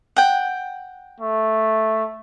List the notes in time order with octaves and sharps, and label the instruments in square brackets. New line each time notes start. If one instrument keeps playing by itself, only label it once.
[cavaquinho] F#5 G5
[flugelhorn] A3